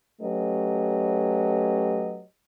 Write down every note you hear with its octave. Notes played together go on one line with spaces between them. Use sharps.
F#3 A3 C#4 G4 B4 D#5